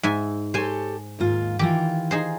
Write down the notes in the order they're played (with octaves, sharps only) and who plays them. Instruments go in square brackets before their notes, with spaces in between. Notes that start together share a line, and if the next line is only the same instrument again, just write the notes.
[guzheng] G#2 E5 G#5
[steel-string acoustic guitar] G4 A4 C#5 [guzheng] C5 G#5
[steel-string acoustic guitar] D#2 G#2 F4
[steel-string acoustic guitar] D#3 E3 F4 [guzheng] G4
[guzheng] D#4 G#4 C5